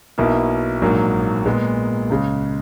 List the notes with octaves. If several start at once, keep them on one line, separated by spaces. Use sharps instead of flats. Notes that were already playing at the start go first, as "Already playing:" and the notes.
B1 B2 A#3 E4
A#1 G#2 F#3 A#3
A#2 G#3 B3
C#2 C#3 G#3